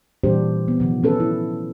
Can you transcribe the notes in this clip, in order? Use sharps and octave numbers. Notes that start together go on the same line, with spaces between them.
A#2 E3 G3 D4 G4 C5
B3
C3 D#3 F3
D#3 C#4 A4 B4
E4